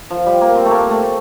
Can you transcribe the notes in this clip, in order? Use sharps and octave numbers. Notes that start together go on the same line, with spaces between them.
F3
G3
A#3
C4
A3
A#3
A3